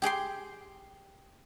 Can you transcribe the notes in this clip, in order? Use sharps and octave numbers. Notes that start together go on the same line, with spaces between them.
G4 G#4 G5 C6